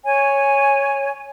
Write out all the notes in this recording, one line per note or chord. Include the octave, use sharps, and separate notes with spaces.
C#5 G#5